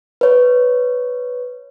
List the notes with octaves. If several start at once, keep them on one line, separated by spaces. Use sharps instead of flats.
B4 C#5